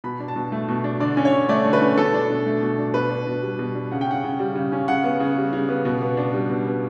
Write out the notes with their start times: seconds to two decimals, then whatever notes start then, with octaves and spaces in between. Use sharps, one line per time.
0.04 B2 B5
0.20 D4
0.28 A5
0.36 B2
0.52 A3
0.68 B2
0.84 D4
1.00 D3 D5
1.17 C#4
1.25 C#5
1.33 D3
1.49 A3 D5
1.65 D3
1.73 B4
1.82 C#4
1.97 B2 A4
2.14 D4
2.30 B2
2.46 A3
2.62 B2
2.78 D4
2.94 B2 B4
3.11 D4
3.27 B2
3.42 G3
3.59 B2
3.75 D4
3.91 C#3 F#5
4.01 G5
4.07 C#4 F#5
4.24 C#3
4.39 G3
4.55 C#3
4.72 C#4
4.88 C#3 F#5
5.04 B3
5.20 C#3
5.37 G3
5.53 C#3
5.69 B3
5.85 B2
6.01 B3
6.17 D4
6.33 G3
6.50 B2
6.66 B3